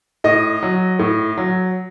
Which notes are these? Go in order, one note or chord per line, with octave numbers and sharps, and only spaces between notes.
A2 D#5
F#3
A2
F#3